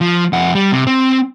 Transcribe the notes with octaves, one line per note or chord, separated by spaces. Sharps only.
F3
F2 F#5
G3
C3
C4